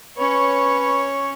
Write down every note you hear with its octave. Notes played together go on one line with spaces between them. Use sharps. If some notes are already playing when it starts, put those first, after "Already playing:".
C#4 B4 C#5